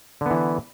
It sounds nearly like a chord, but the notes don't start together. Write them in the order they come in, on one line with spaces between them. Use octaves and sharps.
D3 B3 E3